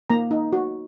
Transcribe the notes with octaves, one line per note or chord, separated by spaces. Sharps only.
A#3 A#5
D#4
F#4